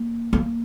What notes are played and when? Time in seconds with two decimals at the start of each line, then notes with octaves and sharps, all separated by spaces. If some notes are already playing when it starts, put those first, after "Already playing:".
Already playing: A#3
0.33 A#3